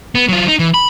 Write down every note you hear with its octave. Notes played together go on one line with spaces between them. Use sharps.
B3
F#3 F4
D#4
E3
B5